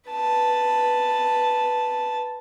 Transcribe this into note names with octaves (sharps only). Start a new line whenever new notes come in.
B4 A5